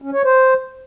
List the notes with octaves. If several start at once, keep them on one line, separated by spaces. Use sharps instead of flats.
C#4
C#5
C5